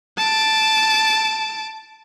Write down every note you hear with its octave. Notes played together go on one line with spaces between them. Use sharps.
A5 D7